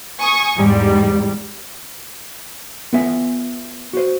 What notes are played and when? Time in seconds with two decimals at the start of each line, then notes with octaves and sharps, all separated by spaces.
0.20 G#5 C#6 D#6
0.57 E2 G#2 G3
2.93 B3 F4 A4 E5 G#5
3.93 F#4 C5